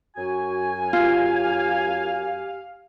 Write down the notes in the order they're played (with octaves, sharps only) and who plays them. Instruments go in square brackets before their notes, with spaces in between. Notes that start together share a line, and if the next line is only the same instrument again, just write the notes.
[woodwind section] F#2 G#5 [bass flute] F#4
[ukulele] F4 [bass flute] G4 [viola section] F5